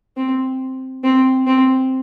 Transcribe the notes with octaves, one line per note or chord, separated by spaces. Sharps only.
C4
C4
C4